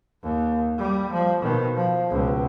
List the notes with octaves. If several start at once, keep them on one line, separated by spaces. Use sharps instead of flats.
D#2
G3
F3
B2 D#3
F3
C#2 B2